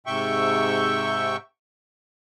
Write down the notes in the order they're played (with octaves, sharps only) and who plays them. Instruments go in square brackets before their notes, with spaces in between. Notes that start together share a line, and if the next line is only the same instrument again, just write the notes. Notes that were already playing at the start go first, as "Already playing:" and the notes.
[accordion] G#2 C3 E5 G5 C#6